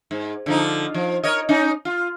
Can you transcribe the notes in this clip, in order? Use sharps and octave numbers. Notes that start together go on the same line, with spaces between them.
G#2
D3 F3 D#4
F3
A#4 C#5 D#5
C#4 D#4
F4